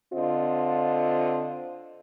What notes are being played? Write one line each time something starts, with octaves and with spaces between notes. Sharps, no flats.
D3 C4 F4 D#5